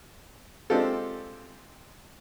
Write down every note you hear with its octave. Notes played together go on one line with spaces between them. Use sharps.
G#3 C4 D4 F4 G4 A4